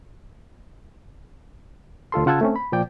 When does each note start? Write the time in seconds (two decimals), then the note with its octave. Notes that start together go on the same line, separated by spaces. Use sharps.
2.12 D2 F4 A4 C6
2.26 C#3 F4 F#5 A5 E6 G#6
2.41 A3 C4 C#4
2.56 B5
2.72 A#2 F3 D5 G5